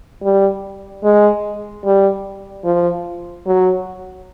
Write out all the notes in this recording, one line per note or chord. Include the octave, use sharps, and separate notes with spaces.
G3
G#3
G3
F3
F#3